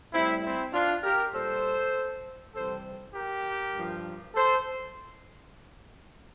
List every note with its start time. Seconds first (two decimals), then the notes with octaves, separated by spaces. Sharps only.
0.12 A2 G3 C4 E4
0.43 C4 E4
0.73 D4 F4
1.03 G4 A#4
1.33 A#2 G3 A4 C5
2.54 C3 E3 G3 A4 C5
3.14 G4 A#4
3.74 G2 F3
4.35 A4 C5